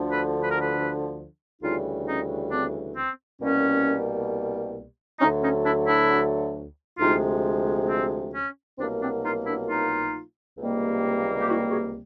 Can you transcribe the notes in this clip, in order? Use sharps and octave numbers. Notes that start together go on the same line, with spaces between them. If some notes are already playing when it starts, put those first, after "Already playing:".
Already playing: D2 D3 F3
A4 B4
B4
A#4
A4 B4
D2 C#3 E3 G3 D#4 F4
C#4 D#4
C4 D4
C4
C2 B2 G3 A#3 C#4
D2 D3 F#3 A3 C#4 D#4
C#4 D#4
D4 E4
D4 E4
D2 C3 F3 G#3 D#4 F4
C4
C#4
C2 B2 F#3 A#3 C4 D4
C4 D4
D#4 F4
D4 E4
D#4 F4
C#2 C3 D#3 G3 A#3
G4
E4 F#4
F#4 G#4